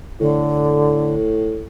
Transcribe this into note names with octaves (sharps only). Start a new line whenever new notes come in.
A2 D3